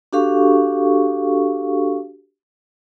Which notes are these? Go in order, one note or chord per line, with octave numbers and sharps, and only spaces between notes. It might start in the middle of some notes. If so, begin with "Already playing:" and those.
D4 F#4 G4 A4 F5 C#6